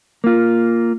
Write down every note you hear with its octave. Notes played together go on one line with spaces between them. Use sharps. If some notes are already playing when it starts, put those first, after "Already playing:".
A#3 F4